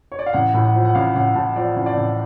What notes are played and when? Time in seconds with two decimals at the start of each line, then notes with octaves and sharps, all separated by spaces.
0.12 C#5
0.19 D5
0.26 F5
0.33 A1 F#5
0.54 A2
0.64 F#5
0.74 F3
0.85 F#5
0.95 A1 F5
1.15 A1 F#5
1.35 A2 A5
1.56 F3 D5
1.76 A1
1.86 D5
1.97 A1